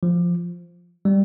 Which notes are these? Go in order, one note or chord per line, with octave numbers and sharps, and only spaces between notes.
F3
G3